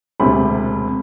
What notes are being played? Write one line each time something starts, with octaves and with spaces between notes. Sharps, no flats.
E1 D2 C3 B5